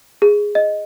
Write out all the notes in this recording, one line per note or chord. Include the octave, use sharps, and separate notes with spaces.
G#4
D#5